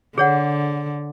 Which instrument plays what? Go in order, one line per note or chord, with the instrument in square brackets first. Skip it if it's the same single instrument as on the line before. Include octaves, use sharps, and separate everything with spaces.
[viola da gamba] D3 [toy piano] G#4 C#5 F#5